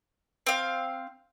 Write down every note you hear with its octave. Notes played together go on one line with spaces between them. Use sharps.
C4 F5